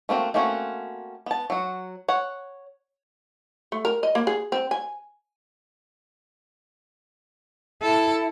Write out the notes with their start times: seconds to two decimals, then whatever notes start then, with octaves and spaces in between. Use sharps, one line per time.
0.09 A3 A#3 C4 F#4 A#4
0.34 A3 A#3 C4 C#4 F#4
1.26 B3 A5
1.50 F#3 F#4
2.08 C#5 F#5
3.72 A3
3.85 A#4
4.03 D#5
4.15 A#3
4.27 G#4
4.52 C4
4.71 G#5
7.83 E4 A4